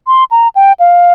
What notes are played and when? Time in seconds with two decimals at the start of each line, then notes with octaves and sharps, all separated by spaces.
0.07 C6
0.31 A#5
0.55 G5
0.80 F5